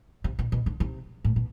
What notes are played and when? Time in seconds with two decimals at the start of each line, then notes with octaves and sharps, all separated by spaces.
0.24 C3
0.39 B2
0.52 B2
0.66 D3
0.80 C3
1.25 A2
1.36 B2